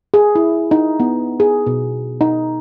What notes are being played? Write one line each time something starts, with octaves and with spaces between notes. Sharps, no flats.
G#4
E4
D#4
B3
G#4
B2
D#4